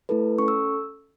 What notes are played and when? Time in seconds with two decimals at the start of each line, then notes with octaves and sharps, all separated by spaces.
0.09 A3 E4 A4 B4
0.38 C#4 A4 C#6
0.48 E6